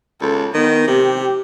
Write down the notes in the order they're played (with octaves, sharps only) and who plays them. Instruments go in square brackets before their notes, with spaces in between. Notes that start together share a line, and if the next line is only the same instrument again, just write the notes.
[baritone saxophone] C#2 [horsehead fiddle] A4
[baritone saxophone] D#3 [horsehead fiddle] B3
[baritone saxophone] C3 [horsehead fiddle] G4